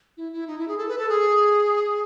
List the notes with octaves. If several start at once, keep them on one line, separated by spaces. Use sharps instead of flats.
E4
E4
D#4
E4
G#4
A4
B4
A4
G#4